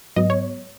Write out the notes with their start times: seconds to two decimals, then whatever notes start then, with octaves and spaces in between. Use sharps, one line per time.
0.16 G#2 F#3 B3 D#5
0.30 C#5